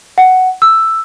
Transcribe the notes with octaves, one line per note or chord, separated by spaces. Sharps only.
F#5
E6